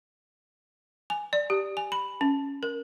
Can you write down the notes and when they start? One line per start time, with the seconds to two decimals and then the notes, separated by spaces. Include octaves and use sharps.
1.10 G#5
1.33 D5
1.50 G4
1.77 G#5
1.92 B5
2.21 C#4
2.63 A#4